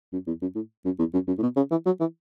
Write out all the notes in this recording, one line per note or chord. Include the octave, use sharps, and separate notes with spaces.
F#2
E2
F#2
A2
F#2
E2
F#2
F#2
A2
B2
C#3
E3
F#3
E3